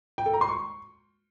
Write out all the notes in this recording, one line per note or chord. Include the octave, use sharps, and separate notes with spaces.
G5
A4
A#5
C6
C#6